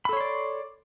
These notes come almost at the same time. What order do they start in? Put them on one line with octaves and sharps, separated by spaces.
B5 A4 C#5 C6 D5